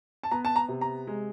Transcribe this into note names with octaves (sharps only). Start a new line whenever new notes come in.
A5
B3 A#5
A5
A#5
C3
A#5
G#3